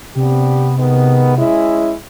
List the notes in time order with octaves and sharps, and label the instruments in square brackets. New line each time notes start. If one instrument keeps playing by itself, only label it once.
[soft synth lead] C3 [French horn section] B3 D4 G4
[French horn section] D#3 G#3 B3
G#3 C#4 E4